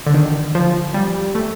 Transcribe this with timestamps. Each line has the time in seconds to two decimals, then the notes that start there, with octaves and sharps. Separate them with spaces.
0.07 D3
0.14 D#3
0.55 F3
0.94 G3
1.35 A3